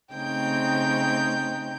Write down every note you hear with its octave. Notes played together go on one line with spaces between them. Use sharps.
C#3 A3 C4 D#4 G5 G6